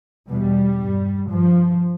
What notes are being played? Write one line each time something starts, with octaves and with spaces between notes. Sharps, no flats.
E2 B2 G3
G2
G2 F3